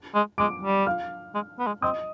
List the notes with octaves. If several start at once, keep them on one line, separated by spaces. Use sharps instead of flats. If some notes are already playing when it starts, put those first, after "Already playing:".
Already playing: D7
G#3
G#3 D6 D7
G3
F5 F6
G#3
B3
G#3
C4 D#5 D#6